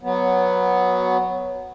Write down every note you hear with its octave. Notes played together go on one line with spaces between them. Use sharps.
F#3 B3